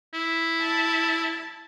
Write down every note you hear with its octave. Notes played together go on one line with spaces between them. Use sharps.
E4
A5